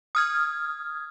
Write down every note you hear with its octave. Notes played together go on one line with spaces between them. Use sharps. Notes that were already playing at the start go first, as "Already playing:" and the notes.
D#6 F6 G#6